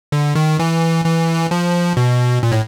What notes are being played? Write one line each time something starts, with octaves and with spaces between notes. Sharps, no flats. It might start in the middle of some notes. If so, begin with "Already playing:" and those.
D3
D#3
E3
E3
F3
B2
A#2
A2